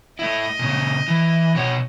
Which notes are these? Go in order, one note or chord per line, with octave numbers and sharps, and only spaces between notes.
A3 E4 D#5
A#2 C#3
E3
B2 F#4 C#5